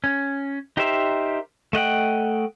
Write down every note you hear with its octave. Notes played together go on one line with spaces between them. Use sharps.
C#4
D#4 G4 A#4 C5 E5
A3 D#5 F#5 G5